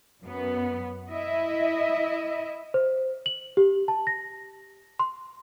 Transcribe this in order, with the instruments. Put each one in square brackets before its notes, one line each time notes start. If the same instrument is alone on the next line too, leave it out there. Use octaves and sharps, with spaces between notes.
[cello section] F#2 B3
E4 D#5 E5
[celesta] C5
F#7
G4
A5
A#6
C6